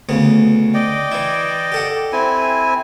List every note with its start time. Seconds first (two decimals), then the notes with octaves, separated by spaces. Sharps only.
0.09 D2 C#3 B3
0.74 D5 D#5 G5
1.12 E3 E4
1.72 G4 A4 F#5
2.13 C4 E4 G#5